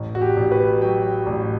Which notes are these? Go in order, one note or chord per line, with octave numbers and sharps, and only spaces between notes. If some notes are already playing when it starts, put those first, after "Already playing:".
Already playing: A1
F#4
G4
A1
B4
F#3 G5
A1